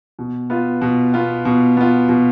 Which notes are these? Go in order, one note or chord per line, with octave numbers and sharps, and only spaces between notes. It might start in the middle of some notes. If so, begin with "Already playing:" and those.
B2
B3 F4
B2
B3 F4
B2
B3 F4
B2